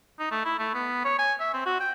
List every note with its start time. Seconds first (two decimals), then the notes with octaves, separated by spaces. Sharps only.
0.19 D#4
0.31 A3
0.45 E4
0.59 A3
0.74 B3
1.05 C#5
1.19 G#5
1.40 E5
1.54 C4
1.66 F#4
1.80 G5